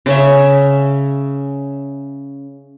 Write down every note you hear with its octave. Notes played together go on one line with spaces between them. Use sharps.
C#3 C#4 E5